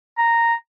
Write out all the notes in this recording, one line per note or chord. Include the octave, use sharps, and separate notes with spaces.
A#5